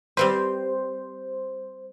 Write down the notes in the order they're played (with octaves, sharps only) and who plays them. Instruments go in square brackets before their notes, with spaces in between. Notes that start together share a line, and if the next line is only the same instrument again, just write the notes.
[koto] G3 C4 B4 [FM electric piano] C5